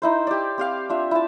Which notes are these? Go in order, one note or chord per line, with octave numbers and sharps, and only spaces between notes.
D#4 E4 C5
G4 D5
C4 G4 F5
D4 F4 E5
E4 A5